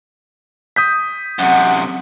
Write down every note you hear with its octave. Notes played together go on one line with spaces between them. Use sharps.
D#6 G6 B6
F#2 C3 F#5